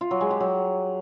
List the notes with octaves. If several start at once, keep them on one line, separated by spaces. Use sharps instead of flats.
F4
F#3
G#3
G4
F#3